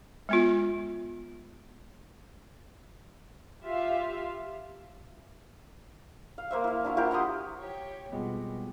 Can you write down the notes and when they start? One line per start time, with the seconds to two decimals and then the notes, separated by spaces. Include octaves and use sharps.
0.29 G#3 B3 F4
3.63 F4 G4 E5 F5
6.38 F5
6.51 A#3 C5 E5
6.64 E4 F5
6.84 D4 E4 F#4
6.97 E4 F4 G4 A#4
7.11 F#5 A#5 C6 D#6
7.58 G4 C#5
8.12 F2 B2 G3 G#3 B3